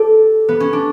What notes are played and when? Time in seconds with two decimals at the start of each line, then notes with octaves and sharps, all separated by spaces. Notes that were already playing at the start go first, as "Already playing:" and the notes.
Already playing: G4 A4
0.49 B3
0.60 C#4
0.73 D4